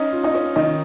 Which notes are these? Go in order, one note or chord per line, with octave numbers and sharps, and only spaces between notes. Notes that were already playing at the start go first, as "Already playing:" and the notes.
Already playing: C#4 D#4 D#5
F4
D#4 D#5
C#4
D#3 D#4 D#5